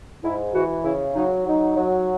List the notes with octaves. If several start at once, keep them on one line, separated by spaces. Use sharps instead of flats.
G#2 E4
E3 F#4
C#3 E4
F#3 D#4
F#3 D#4
F#3